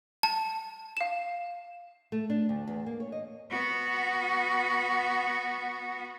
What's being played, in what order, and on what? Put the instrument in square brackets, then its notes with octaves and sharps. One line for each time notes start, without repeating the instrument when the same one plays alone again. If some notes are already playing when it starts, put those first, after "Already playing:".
[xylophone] A5
F5 E7
[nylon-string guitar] A3
D4
D2
E2
A#3
C#5
D#5
[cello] B3 F#4